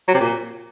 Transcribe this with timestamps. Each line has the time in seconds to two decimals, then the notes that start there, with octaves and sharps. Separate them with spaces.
0.08 F#3
0.14 C3
0.21 A#2